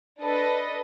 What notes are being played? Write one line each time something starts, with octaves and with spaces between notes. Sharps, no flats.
D4 A4 B4 D#5